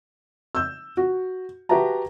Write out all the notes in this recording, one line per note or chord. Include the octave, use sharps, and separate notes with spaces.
E6 G6
F#4
F#4 G4 B4 E5 A5 A#5